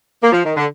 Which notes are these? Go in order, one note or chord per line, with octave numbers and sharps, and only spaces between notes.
A#3
F3
D#3
D3